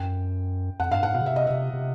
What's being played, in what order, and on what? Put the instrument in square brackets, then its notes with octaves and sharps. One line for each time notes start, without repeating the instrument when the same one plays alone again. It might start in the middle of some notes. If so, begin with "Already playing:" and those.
Already playing: [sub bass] F#2 [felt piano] G5
[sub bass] F2 [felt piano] F#5
[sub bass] G2 [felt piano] F5
[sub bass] G#2 [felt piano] F#5
[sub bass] B2 [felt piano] F5
[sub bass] C#3
[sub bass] C3 [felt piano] E5
[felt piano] D#5
[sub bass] C3 [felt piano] E5
[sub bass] C3